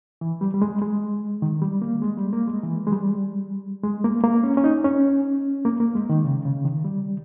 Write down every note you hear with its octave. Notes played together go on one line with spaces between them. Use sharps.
E3
G3
G3
G#3
G#3
D#3
G3
A#3
G#3
G3
A#3
G#3
E3
G#3
G3
G#3
A#3
A#3
C#4
C#4
D#4
C#4
A#3
A#3
G#3
D#3
C#3
C#3
D#3
G3